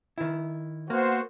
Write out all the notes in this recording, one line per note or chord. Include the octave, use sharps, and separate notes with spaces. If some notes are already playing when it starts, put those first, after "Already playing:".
D#3 E4
A#3 B3 F#4 C5